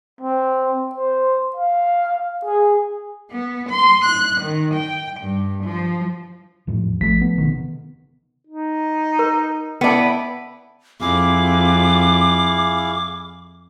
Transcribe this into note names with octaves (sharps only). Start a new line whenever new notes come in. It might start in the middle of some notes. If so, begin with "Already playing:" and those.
C4
C5
F5
G#4
B3
C6
F#6
D#3
G5
G2
F3
E2 A2 F3
A1 F3 A3 B6
B3
C3 D#3
D#4
A#4
B3 E4 D5 G5 A5
F2 E4 G#4 F5 D6